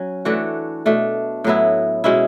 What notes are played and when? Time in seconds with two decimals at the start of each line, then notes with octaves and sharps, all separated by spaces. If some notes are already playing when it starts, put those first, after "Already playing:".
Already playing: F#3 C#4
0.25 E3 A3 D4 F#4
0.86 B2 A3 D4
1.44 A2 F#3 B3 E4
2.04 B2 G#3 C#4 E4